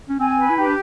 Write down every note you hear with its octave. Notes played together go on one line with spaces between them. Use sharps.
C#4
C4 G#5
B4
E4
D#4 G4
D4